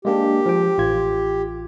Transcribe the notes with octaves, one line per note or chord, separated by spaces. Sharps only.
G#3 A#3 D4 G4
F3 G5
A1 F4 G#6